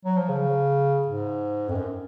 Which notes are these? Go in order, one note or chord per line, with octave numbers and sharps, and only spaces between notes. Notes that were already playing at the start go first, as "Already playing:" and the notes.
F#3
F3
C#3
G#2
F2
F#2